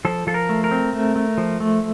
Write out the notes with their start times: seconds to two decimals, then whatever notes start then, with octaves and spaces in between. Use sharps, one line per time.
0.05 F3 A4
0.27 F3 A4
0.34 A#4
0.49 A3
0.64 A#4
0.71 C4
0.93 A3
1.16 A3
1.38 F3
1.60 A3